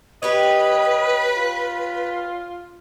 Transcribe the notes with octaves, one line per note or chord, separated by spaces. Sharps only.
G4 B4 C#5 D#5
F4